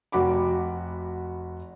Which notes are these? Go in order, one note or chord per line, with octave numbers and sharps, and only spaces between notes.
F1 F#4 B5 D6